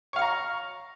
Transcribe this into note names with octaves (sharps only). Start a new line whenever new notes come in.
C#5 F5 A#5 C#6